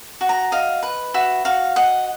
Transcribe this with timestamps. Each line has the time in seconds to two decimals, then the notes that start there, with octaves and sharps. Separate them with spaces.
0.21 F#4
0.29 A#5
0.52 D#5 F5
0.83 B4
1.14 F#4 E5
1.45 F#4 F5
1.76 D#5 F#5